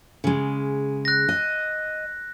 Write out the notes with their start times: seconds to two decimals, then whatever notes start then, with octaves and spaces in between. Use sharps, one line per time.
0.24 C#3 G#3
1.05 F#6 A#6
1.29 D#5